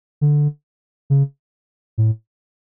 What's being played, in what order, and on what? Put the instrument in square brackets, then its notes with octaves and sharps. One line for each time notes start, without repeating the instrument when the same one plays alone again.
[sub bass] D3
C#3
A2